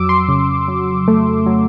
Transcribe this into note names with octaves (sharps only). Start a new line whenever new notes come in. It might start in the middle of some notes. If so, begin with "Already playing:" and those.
Already playing: F2 F#3 D6 E6
C6
C#3
F#3
A3
F#3